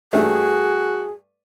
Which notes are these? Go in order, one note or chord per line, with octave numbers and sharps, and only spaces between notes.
G2 A3 F#4 G#4